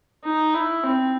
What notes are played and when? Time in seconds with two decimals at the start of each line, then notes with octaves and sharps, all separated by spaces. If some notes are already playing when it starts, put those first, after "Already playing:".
0.24 D#4
0.54 E4
0.83 C4